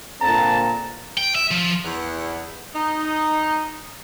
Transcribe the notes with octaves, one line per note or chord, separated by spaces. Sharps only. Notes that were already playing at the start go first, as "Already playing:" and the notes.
A#2 D3 C4 A5 A#5
G5
E5
F3
E2
D#4